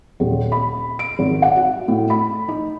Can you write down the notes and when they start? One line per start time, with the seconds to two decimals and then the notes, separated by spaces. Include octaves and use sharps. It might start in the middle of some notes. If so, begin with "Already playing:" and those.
0.20 D#1
0.52 B5
0.99 D7
1.19 G#1
1.42 F#5
1.56 F#4
1.88 A2
2.10 B5
2.48 D#4